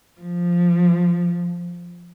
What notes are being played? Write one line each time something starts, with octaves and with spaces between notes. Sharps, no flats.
F3